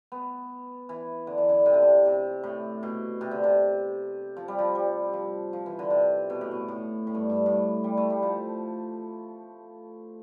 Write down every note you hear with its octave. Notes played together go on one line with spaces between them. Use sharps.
B3
E3
D3
E3
D3
C3
D3
C3
C3
A2
B2
C3
D3
C3
F3
G3
F3
G3
F3
F3
E3
D3
C3
B2
A2
B2
A2
A2
G2
G2
A2
G3
A3
G3
F3